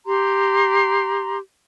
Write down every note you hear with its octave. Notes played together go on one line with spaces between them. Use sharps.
G4 A#5 C6